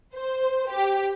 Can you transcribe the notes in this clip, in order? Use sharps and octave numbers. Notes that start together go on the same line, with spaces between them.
C5
G4